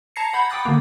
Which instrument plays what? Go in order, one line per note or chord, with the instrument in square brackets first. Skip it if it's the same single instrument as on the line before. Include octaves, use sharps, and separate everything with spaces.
[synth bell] A5 A#5 G#6 A#6 C7 C#7
F#5 B5 G6 G#6 A#6
G5 D6 D#6 F#6 A6
D3 A#3